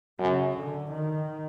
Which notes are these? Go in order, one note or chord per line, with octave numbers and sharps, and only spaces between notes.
F#2 C#3
D3
D#3